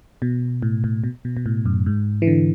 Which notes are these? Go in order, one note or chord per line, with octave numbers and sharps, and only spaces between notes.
B2
A2
A2
B2
B2
B2
A2
F#2
G#2
E3
D3